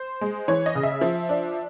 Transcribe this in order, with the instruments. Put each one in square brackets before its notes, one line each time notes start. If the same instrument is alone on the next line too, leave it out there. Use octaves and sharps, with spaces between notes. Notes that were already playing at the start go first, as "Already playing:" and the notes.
Already playing: [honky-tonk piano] C5
G#3
E3 C#5
D#5
C#3
E5
F3
D4